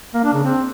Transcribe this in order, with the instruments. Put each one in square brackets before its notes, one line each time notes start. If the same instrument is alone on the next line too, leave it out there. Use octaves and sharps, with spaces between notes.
[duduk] A#3
D4
C#3
C4